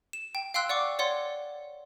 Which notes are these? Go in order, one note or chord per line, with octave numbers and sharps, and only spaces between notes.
E7
G5
F5 G5 C6 E6 F#6
D5 F#5 C#6 D6
C#5 D5 F#5 C6